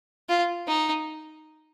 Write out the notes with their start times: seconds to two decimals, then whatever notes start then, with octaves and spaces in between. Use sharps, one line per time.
0.29 F4
0.67 D#4